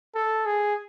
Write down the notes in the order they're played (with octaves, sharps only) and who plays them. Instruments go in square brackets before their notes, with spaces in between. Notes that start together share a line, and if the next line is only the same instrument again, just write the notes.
[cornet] A4
G#4